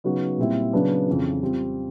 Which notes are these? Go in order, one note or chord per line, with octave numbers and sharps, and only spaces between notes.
C#3 F#3 B3 D#4 F#4
A#2 G3 C4 E4
C#3 F#3 B3 D4
F2 C#3 E3
G3 C4 F4